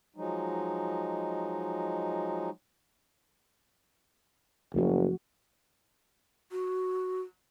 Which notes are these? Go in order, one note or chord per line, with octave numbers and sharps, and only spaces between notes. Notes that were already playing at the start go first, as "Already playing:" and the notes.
F3 F#3 G#3 D#4
F#1 F3 A3 F#4
F#4